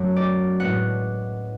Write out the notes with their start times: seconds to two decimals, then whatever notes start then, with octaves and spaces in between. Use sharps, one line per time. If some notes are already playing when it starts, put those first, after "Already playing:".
Already playing: F#2 F#3 A3
0.16 D5
0.59 A2 G#3 B3 F#5